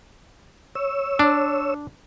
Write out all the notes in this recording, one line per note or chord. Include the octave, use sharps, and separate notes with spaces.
C#5 E6
D4